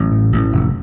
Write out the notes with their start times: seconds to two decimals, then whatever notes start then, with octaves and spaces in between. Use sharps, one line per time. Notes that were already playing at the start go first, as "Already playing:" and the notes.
Already playing: A1 F#3
0.12 A2
0.32 A1
0.52 F1